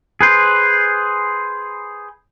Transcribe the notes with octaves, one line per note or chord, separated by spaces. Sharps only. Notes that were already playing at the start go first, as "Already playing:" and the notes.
G#4 B4 C5